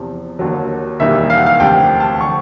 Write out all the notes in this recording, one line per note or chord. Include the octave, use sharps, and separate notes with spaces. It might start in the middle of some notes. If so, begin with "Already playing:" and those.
Already playing: E2 C3 F3
D#2 D3 F#3
E1 D#2 D#3 G3 E5
F5
F#5
F5
D2 C3 F3 G5
A5
D3 F3 C#6